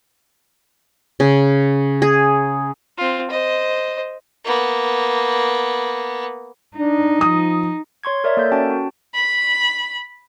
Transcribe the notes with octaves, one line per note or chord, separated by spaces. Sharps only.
C#3
G#4
C4 F4
C5 D#5
A#3 B3
D4 D#4
F3 D#6
C#5 C6 C#6 G#6
A#4 C#5 D5 E5
A#3 A4 A#4 G6
C#4 F#4 G5 A5
F#4
B5